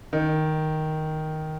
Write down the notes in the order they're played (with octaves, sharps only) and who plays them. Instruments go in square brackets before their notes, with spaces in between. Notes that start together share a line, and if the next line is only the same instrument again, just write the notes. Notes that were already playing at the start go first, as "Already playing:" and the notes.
[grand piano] D#3